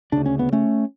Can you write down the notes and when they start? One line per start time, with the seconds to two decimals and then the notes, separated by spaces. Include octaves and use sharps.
0.12 D2 C#3 D4
0.26 C#4
0.39 B3
0.53 A3 C#4